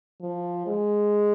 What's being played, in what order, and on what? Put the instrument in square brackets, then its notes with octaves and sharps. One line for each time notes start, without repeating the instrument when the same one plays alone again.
[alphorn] F3
G#3